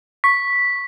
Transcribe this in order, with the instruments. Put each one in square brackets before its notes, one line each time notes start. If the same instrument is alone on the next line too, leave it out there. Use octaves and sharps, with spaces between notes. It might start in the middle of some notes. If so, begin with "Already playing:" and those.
[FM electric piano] C#6 [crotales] B6